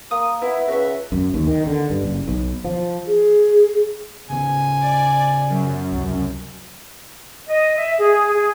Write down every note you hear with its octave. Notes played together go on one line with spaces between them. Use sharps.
A#3 D#6
B3 E4
C#2 F#4 E5
F#2
D#2
D#3
D3
G2
F#1
B1
F3
G#4
C#3 B3 G#5
D5
F#2
C#2 C3
D#5
E5
G#4
G#4